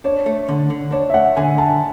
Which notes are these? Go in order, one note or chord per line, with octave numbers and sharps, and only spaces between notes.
D4 C#5
A3
D3
D3
D4 C#5
E5
A3 F#5
D3 G#5
D3 A5